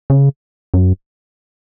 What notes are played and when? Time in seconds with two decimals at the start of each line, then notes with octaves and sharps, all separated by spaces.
0.10 C#3
0.74 F#2